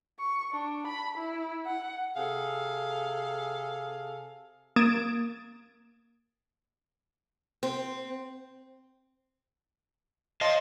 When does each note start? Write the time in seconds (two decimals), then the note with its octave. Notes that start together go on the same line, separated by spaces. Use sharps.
0.19 C#6
0.53 D4
0.87 B5
1.18 E4
1.66 F#5
2.16 C3 G#4 A4 F5
4.76 A#3 D#6 G#6 A6 D7 E7
7.63 C4
10.41 C#5 D#5 F5 A5 C6